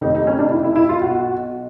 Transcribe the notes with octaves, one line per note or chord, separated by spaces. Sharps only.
F1 F2 C3 D#3 D#4
D#4
C#4
D4
E4
E4
E4
F4
B1 B2 F#4